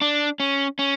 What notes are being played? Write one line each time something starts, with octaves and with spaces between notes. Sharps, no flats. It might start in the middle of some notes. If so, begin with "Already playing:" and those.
D4
C#4
C#4